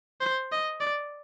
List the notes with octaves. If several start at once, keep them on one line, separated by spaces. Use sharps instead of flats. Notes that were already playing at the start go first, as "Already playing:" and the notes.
C5
D#5
D5